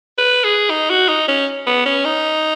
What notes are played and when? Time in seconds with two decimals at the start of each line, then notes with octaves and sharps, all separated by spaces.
0.18 B4
0.44 G#4
0.70 D#4
0.90 F#4
1.09 D#4
1.28 C#4
1.67 B3
1.86 C#4
2.05 D#4